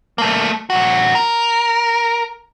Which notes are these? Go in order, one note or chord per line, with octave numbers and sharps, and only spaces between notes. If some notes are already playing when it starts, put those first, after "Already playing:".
A3 A#3
A#2 F#4
A#4